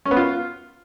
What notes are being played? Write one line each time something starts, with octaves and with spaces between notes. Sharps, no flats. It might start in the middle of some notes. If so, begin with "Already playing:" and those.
C#4
B3
F4